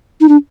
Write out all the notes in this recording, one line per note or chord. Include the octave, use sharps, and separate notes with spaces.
D#4
D4